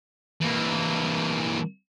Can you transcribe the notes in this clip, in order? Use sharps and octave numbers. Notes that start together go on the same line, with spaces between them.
E3 A#3